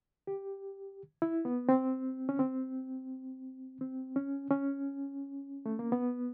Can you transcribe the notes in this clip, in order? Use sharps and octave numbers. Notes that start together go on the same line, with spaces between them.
G4
E4
B3
C4
C#4
C4
C4
C#4
C#4
A3
A#3
B3